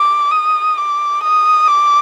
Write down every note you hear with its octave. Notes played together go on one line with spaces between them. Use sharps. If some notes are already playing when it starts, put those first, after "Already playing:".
Already playing: D6
D#6
D6
D#6
D6